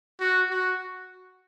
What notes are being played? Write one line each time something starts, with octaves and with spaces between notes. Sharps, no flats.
F#4
F#4